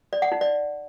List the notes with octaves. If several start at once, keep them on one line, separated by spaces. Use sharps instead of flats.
D5
F#5
D#4
D5